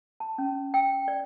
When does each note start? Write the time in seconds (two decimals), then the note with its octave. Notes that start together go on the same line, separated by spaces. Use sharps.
0.20 A5
0.38 C#4
0.74 G5
1.08 D5